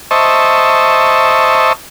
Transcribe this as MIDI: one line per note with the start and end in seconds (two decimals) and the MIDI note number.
0.11 1.73 72
0.11 1.73 75
0.11 1.73 76
0.11 1.73 81
0.11 1.73 85